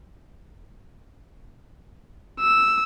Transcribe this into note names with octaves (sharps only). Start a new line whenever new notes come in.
E6